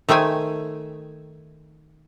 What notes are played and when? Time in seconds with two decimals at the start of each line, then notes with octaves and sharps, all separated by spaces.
0.09 D#3 A3 C5 G5 G#5